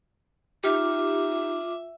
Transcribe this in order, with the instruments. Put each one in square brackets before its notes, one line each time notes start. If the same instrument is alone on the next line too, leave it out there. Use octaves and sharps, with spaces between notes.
[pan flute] D#4 [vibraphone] F4 D6 [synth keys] G4 [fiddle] E5